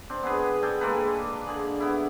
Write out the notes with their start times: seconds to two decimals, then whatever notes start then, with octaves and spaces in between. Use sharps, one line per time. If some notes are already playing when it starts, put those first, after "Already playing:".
0.10 C4 D4
0.23 B3 G#4 B4
0.63 A4 D5 G5 G#5
0.81 G#3 A#3 A4 B4
1.46 D3 G#4 D5
1.80 B3 E4